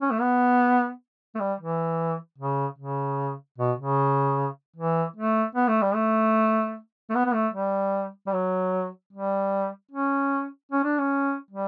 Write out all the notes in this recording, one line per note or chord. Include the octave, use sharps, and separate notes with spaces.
C#4
A3
B3
A3
G3
E3
C#3
C#3
B2
C#3
E3
A3
B3
A3
G3
A3
A3
B3
B3
A3
G3
G3
F#3
G3
C#4
C#4
D4
C#4
G3